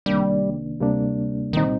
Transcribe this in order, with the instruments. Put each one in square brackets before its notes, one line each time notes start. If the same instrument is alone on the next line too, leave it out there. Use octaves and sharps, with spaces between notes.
[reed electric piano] C2 C3 D#3 A#3 D4 [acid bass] G3
[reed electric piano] D2 C3 G3 A#3 D4
[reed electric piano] C2 A#2 G3 C4 D#4 [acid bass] D#3